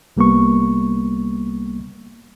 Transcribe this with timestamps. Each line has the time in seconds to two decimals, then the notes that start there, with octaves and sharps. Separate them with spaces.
0.17 C2 G3 A#3 B3 C#6